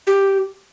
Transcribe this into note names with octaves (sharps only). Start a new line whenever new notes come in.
G4